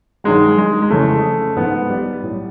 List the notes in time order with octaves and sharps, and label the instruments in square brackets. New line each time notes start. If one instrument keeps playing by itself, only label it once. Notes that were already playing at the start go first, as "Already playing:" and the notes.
[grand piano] G2 D#3 F#3 G#3
G#3
G#3
F2 C#3 E3 A3
G#2 F3 B3
G3
A2 F#3